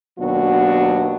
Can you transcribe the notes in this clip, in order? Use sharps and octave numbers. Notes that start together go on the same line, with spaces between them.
D#2 B2 F#3 B3 D4 F#4